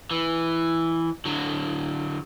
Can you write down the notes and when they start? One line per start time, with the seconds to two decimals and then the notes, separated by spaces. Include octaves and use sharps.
0.11 E3
1.25 D3 F#3